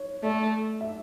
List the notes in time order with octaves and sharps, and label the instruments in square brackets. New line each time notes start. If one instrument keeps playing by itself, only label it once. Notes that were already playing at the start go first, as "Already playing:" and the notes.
Already playing: [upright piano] C#5
[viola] A3 [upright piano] D5
[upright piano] E5